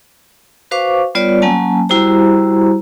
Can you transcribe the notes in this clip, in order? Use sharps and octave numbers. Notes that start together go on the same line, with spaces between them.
F#4 B4 C5 F5 C#6 D6
G3 B3 F4 B4 C#5 D5
F#3 A#3 C#4 G#5 A5
G3 E4 F#4 G4 C5 A#5